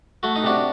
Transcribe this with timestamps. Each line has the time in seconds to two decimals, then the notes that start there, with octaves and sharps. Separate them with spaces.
0.23 A3 F#4
0.36 D#4
0.44 C3 D4 F#4